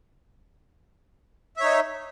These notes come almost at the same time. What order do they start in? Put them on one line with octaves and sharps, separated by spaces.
E5 C#5 D#4